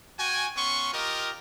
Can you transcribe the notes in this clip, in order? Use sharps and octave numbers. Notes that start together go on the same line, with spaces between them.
F#4 G5 G#5
B3 C#4 C6 C#6
F4 G4 A#4 D#5